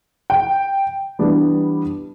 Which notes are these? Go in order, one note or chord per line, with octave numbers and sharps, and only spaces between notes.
G5
E3 G3 B3 D4